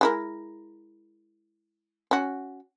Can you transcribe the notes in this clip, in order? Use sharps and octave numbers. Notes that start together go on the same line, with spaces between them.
G#3 E4 A#4
C#4 F#4